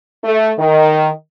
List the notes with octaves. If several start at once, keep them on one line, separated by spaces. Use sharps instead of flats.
A3
D#3